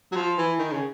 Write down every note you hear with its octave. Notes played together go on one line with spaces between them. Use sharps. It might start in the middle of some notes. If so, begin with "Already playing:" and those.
F#3
F3
E3
D#3
C#3